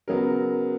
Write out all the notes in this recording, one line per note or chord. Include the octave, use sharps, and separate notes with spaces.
C#3 F#3 B3 A#4